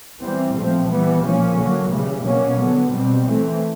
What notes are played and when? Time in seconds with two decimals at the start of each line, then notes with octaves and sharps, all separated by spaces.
0.21 E3 G3 C4
0.54 A#2 F3 A3 C4
0.88 E3 G3 B3
1.23 A#2 F3 A#3 C#4
1.56 D3 F#3 A#3
1.90 C#3 E3 G3
2.23 B2 F#3 A#3 C#4
2.57 D3 F#3 B3
2.90 B2 G3 C4
3.24 E3 A3 C4